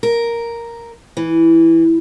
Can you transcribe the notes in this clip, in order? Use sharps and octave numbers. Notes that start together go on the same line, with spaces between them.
A#4
E3